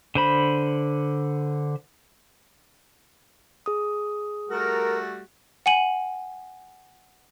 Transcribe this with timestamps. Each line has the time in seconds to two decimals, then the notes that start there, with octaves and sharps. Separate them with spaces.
0.15 D3 C5 B5
3.66 G#4 D#6
4.49 G3 A3 F#4 A#4
5.66 F#5 G#5 D#7 F#7